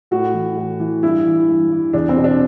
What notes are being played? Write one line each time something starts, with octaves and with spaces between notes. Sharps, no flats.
A2 F#4
E3
A2
E3
G2 E4
E3
G2
E3
E2 D4
C4
B2
D4